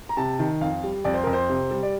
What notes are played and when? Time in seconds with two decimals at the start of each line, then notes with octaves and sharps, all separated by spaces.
0.09 A#5
0.17 C3 A5
0.39 D#3
0.61 F2 F5
0.84 G3
1.04 F2 D5
1.14 C5
1.24 F2 A#4
1.33 C5
1.49 C3
1.71 G3
1.83 D5